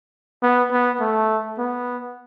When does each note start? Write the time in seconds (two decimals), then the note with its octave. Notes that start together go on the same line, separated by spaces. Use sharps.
0.43 B3
0.72 B3
1.01 A3
1.59 B3